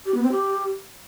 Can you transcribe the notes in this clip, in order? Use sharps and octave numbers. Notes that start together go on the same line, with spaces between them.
G4
B3
C4
G4